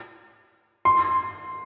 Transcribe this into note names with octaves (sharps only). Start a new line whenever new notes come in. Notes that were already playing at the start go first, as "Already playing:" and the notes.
C6